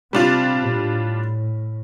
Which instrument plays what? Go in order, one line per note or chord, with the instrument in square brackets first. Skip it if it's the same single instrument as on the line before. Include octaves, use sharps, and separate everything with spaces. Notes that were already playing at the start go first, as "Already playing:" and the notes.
[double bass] C3 [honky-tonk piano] G3 D4 F4
[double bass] A2